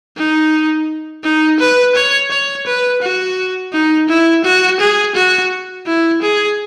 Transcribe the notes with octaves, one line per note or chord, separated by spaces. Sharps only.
D#4
D#4
B4
C#5
C#5
B4
F#4
D#4
E4
F#4
G#4
F#4
E4
G#4